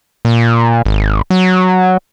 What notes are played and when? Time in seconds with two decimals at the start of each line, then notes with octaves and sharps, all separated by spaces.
0.25 A#2
0.85 G#1
1.30 F#3